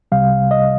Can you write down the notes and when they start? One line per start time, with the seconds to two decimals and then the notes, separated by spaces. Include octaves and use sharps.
0.12 C2 C3 G3 F5
0.51 D#5